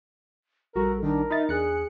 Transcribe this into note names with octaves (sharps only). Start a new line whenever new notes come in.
A#1 G3 F#4 A4 A#4
D#3 D4 A#4
D#4 E5 B5 A6
E2 D4 G#4 F#6 C#7